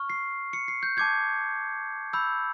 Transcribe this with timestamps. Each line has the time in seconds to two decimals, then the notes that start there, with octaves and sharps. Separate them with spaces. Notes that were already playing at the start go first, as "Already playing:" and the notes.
Already playing: C#6 F6
0.10 C7
0.53 C#7
0.68 C7
0.83 G6
0.97 A5 D6 G6 G#6
2.13 B5 E6 G6